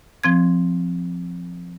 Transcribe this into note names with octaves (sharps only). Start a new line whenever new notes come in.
F3 C4 G#6